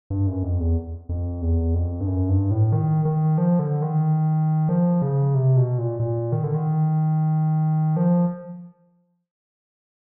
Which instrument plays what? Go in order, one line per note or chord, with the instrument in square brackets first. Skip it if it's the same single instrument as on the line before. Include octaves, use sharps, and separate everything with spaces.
[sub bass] G2
F#2
F2
E2
F2
E2
F2
G2
F#2
G2
A2
D#3
D#3
F3
D3
D#3
F3
C#3
C3
B2
A#2
A#2
D#3
D3
D#3
F3